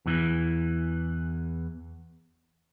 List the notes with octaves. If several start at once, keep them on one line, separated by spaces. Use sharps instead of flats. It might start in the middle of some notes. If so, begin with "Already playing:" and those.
E2 E3